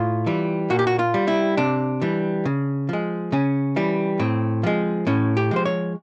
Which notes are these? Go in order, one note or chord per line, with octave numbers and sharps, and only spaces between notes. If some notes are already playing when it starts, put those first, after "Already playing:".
Already playing: A2 F4
E3 G3
A#2 F#4
G4
F#4
F4
G3
E4
C3 D4
E3 G3
C#3
F3 G#3
C#3 C#4
E3 G3
A2 C4
F3 G#3
A2 C#4
G4
F3 G#3 C5
C#5